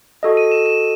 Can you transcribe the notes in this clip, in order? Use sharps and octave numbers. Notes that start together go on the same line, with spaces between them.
F#4 A4 D#5
D#7
E7
E7